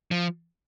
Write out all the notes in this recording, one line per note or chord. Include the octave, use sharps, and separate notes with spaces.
F3